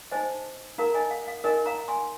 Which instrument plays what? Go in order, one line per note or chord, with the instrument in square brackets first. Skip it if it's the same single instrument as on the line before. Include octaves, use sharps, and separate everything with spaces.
[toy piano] D#4 C5 D#5 G#5
D#4 A#4 F5 A#5
D#5 G#5
F5
F5
D#4 A#4 D#5 G#5
F5 A#5
G#5 C6